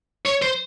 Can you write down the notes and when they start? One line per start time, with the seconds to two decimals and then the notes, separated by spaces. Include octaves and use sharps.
0.26 C#5
0.42 C5